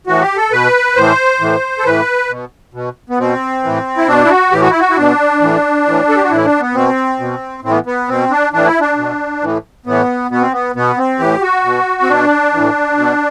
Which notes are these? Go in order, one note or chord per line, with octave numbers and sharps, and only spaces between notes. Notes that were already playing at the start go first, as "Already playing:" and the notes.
A2 E3 F#4
G4
A4
B2 B4
A2 E3 C5
A2 E3
A4
A2 E3 B4
B2
B2
B3
B2 C4
A2 E3
E4
B2 D4
E4
F#4
A2 E3 G4
F#4
E4
F#4
E4
B2 D4
A2 E3
A2 E3
A4
G4
F#4
A2 E3 E4
D4
B3
B2 C4
B2
A2 C4
E3 B3
B3
B2 C4
D4
A2 E3 D4
E4
D4
B2
A2 E3
A2 E3 B3
B2 B3
C4
B3
B2 B3
C4
A2 E3 G4
F#4
B2
C4
B2 D4
A2 E3
B2